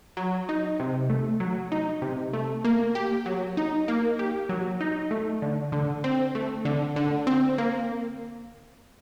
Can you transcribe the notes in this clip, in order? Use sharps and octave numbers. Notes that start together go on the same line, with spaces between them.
F#3
D#4
C3
A3
F#3
D#4
C3
A3
A#3
G4
F#3
D#4
A#3
G4
F#3
D#4
A3
D3
D3
C4
A3
D3
D3
C4
A#3